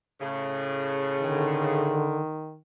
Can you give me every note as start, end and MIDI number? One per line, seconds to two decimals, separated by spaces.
0.21 2.08 45
0.21 2.08 49
1.21 2.20 50
1.21 2.57 51